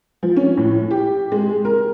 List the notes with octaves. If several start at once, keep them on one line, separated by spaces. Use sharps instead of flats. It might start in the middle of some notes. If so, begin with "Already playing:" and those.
F3
C#4
A2
G4
G#3
A#4